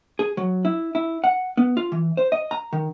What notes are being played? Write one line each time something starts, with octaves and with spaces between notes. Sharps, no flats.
G#4
F#3
E4
E4
F#5
B3
F4
E3
C5
D#5
A#5
D#3